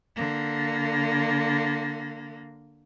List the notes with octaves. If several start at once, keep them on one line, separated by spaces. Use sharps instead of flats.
D3 A#3